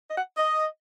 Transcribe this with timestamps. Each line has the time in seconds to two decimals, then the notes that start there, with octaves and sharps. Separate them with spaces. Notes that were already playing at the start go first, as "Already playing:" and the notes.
0.09 D#5
0.15 F#5
0.37 D#5